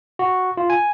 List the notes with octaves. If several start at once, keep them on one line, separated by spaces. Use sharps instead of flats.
F#4
F4
G#5